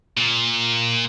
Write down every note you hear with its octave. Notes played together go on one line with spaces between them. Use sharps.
A#2